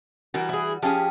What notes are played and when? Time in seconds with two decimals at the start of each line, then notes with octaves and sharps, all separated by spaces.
0.34 E3 G3 F#4 A#4
0.49 E4 G#4
0.82 F3 C#4 G4 G#4